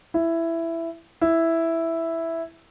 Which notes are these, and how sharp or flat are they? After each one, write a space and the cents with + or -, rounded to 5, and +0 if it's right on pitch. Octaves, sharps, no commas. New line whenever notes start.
E4 +10
E4 +0